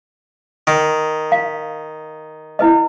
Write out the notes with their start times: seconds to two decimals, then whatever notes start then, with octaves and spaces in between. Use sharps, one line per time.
0.67 D#3
1.32 F5
2.59 E4 B4 D#5